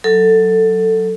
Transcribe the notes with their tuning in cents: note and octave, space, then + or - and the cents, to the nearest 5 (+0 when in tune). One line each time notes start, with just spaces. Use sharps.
F#3 +0 A4 +10